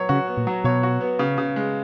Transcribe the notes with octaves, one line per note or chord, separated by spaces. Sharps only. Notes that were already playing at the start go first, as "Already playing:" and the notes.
Already playing: F#3 B3 C#5
C#3 F#4
B3
A#2
F#3
B2 C#5
F#4
B3
C#3
C#3
G#3